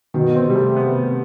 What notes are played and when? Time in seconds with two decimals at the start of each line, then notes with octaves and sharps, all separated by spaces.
0.14 B2 D#3
0.35 C4
0.45 C3 G3
0.55 A3
0.77 B3